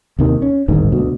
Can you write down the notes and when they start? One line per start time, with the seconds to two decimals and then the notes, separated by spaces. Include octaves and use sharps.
0.19 D#2 C3 D#3
0.42 C#4
0.68 D1 G1 G#2 D#3
0.92 D2 B2